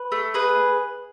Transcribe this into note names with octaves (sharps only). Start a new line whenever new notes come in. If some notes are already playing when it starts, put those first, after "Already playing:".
Already playing: B4
A3
G#4 B4